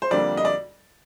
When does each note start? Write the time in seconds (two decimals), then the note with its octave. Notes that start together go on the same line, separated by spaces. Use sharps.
0.02 C5
0.11 F2 D3 G3 A#3 D5
0.37 D#5
0.45 D5